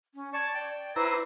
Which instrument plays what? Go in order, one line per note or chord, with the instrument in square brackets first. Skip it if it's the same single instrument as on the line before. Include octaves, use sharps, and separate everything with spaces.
[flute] C#4
[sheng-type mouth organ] D5 A5 C#6 [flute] G#6
[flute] D5 [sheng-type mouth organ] G5
[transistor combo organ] E4 A#5 [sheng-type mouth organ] B4 C5 [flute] D6